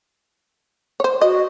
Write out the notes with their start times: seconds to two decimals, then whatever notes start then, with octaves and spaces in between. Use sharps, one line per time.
1.00 C5 C#5
1.21 F#4 D#5